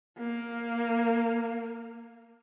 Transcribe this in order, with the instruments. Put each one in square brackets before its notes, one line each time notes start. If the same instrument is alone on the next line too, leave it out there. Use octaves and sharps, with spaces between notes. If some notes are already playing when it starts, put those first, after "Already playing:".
[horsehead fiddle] A#3